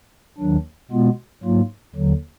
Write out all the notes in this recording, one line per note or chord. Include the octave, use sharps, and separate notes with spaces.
D#2 D#3 F#3 D4
B2 G#3 B3 F4
G#2 F#3 A#3 F4
D#2 D3 F#3